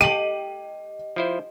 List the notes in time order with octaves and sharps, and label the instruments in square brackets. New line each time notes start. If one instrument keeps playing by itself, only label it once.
[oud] G4 [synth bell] D#5 [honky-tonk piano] D#7 F#7
[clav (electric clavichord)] F3 E4 C5